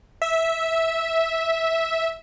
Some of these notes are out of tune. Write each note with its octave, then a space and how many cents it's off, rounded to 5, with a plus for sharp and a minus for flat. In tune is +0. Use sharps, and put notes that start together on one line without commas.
E5 -10